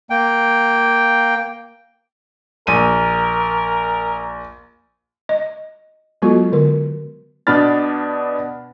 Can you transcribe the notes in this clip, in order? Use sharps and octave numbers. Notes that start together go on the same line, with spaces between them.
A#3 G5
A#1 A#4 D#7
D#5
F#3 G#3 B3 F4 F#4 A4
D3 A#4
B2 B3 D4 B5 F6 A6